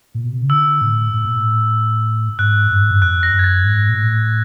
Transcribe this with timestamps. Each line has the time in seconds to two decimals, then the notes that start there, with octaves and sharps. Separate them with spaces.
0.15 A#2
0.24 B2
0.33 C3
0.41 C#3
0.50 D3 E6
0.81 A2
1.13 A2
1.25 A#2
1.37 A2
2.39 G#2 F#6
2.71 G2
2.81 G#2
2.91 G2
3.02 F2 F#6
3.23 A#6
3.34 F#2
3.39 G#6
3.44 A6
3.64 G#2
3.89 A#2
3.96 A2